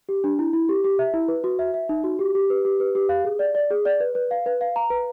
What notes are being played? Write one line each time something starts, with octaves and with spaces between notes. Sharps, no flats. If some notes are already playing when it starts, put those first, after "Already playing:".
G4
D4
E4
E4
G4
G4
E5
E4
B4
F#4
E5
E5
D#4
F#4
G4
G4
B4
G4
B4
G4
F5
G#4
D5
D5
G#4
D5
B4
B4
F5
B4
F5
A#5
B4